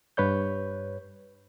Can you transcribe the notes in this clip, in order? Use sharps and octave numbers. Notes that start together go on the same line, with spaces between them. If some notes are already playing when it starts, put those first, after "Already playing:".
G2 B4 C#5 G6